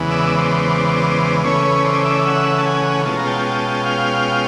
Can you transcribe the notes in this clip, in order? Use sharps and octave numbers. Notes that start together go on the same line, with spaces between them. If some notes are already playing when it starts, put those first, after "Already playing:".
Already playing: E2 C#3 E3 G#3 B3
D5 E5
C5 D5
C5 D5
C#3 E3 A3 C#4 B4 C#5
B4 C#5
C5 D5
D5 E5
E5 F#5
A5
F#5 G#5
B2 G#3 C#4 F4 A5
A#5
G5 A5
G5 A5
F5 G5